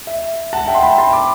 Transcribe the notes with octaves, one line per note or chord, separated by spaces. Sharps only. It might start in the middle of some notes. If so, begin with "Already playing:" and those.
E5
F#5 A5
E5 G5
C6
G5 B5
A5 C6
B5 D6